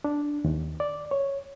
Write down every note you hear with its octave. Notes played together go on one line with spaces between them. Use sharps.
D4
D#2
D5
C#5